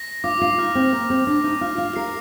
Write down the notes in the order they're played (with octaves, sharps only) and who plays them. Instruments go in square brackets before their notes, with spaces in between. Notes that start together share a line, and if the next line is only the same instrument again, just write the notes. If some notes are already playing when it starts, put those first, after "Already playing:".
Already playing: [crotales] A#6
[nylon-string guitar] F4 [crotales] D6
[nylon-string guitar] F4
[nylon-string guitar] D#4 [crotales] F6
[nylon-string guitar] C4
[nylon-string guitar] A#3 [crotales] F6
[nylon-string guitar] C4
[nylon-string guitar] D4 [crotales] A#6
[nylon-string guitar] D#4
[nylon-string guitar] F4 [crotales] F6
[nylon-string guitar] F4
[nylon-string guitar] A#4 [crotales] C7